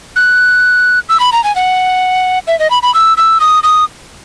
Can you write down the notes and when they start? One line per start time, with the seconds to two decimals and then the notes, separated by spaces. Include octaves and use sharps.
0.16 F#6
1.09 E6
1.20 B5
1.32 A#5
1.44 G#5
1.56 F#5
2.47 E5
2.59 D#5
2.71 B5
2.83 B5
2.95 E6
3.17 E6
3.40 D#6
3.63 D#6